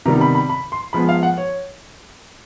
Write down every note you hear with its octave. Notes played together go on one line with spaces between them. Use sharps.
C3 D#3 G3 B3 A#5
B5
B5
B5
C6
F3 G#3 B3 B5
F5
F#5
C#5